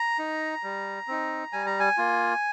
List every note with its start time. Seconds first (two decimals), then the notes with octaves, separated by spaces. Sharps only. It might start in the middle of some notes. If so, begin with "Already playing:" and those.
Already playing: A#5
0.19 D#4
0.63 G3
1.08 C4 D#4
1.53 G3 G#5
1.66 A#5
1.80 G#5
1.98 A#3 F4